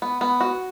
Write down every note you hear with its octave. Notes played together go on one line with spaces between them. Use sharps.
B3
B3
F#4